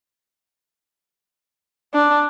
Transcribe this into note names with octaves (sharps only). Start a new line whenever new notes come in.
D4